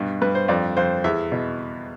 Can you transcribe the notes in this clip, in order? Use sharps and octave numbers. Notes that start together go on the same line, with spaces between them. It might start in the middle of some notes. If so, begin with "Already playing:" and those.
Already playing: G2 B2
G2 B4
C5
F2 D5
F2 C5
E2 E5
B2